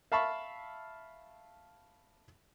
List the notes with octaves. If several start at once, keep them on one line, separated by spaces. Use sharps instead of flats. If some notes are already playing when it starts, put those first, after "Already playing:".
E5 F5 A5 B5 C#6